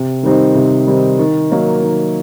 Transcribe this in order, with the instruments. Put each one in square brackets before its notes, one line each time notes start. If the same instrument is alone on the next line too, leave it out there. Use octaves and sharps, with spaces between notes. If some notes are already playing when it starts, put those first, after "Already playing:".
Already playing: [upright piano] C3
D#3 G3 C4 D#4
C3
D#3 G3 C4 D#4
D#3
F#3 A#3 D#4
D#3